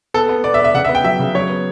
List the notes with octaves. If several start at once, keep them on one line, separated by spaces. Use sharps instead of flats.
B3 A4
B3
B3 D5
E5
B3
E5
C#3 F#5
E5
B3
G5
F#3 E5
C#3
F#3 C#5
B3